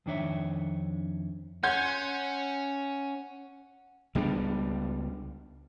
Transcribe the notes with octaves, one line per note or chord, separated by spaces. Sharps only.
F2 D#3 D4 C#5 E5
C#4 F#5 C6 G6 G#6
C#2 G3 B3 D4